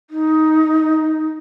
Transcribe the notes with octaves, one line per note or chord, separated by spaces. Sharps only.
D#4